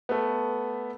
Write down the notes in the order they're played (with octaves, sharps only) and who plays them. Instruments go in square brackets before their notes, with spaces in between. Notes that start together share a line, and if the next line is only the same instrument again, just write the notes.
[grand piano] A3 B3